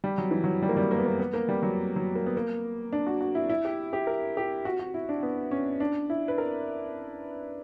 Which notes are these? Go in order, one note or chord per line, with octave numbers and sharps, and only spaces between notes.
G3
F#3
E3
F#3
G3
A#3
G3
A#3
B3
A#3
B3
A#3
G3
F#3
F#3
A#3
B3
A#3
D4
F#4
F#4
E4
E4
G4
G4
A#4
G4
F#4
F#4
E4
D4
B3
C#4
D4
E4
B4
A#4